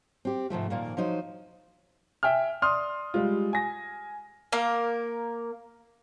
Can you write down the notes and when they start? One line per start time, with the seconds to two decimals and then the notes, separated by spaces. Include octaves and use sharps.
0.25 C4 G4
0.50 G#2 C3 F3 A3
0.70 F2 A#2 D#3 A#3
0.97 F3 F#3 D#4 C5
2.23 E5 G5 G#5 F6
2.62 D5 C6 D#6 F6
3.14 G3 G#3 F4
3.53 G#5 A#6
4.52 A#3 A#4